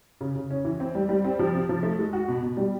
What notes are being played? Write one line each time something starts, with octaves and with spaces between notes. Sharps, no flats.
C#3
C#3
C#4
E3
C4
G3
G3
C4
F3
C3
F3
A3
G#3
F#4
B2
B2
G3